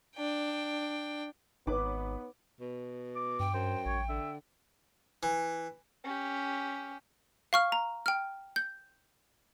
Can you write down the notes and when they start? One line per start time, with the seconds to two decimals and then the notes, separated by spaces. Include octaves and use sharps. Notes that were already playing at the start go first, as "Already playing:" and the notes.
0.17 D4 G5
1.67 G#1 B3 D#4 B4 C#5 D6
2.60 B2
3.15 D6
3.40 G2 G5
3.54 F#2 C5
3.86 A1 C#5
4.09 D3 E5
5.23 E3
6.04 C#4 G4
7.53 F5 C#6 F6
7.72 A#5
8.06 G5 F6
8.56 G6